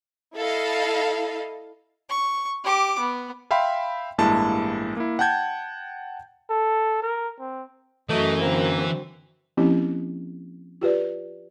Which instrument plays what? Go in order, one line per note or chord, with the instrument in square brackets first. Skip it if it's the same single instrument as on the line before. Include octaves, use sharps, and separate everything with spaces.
[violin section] E4 A4 D#5 F5
[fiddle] C#6
G4 D6
B3
[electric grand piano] E5 F5 G5 B5 C6
A1 G2 G#3 A#3 E4 A5
A#3 E4
F#5 G5 A5 G6 G#6
[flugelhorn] A4
A#4
C4
[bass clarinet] F#2 [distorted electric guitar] E3 [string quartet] F#3 D#5 [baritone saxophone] A3
[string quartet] D3 F#3 C4 [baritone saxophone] A#3
[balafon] F3 A#3 C4 C#4 E4 G4
F4 G4 B4 D5